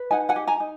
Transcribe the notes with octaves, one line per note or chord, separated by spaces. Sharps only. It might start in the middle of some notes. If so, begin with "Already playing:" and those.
Already playing: B4
D#4 F#5 G#5
F#5 G#5
G4
G#5 A#5
D#4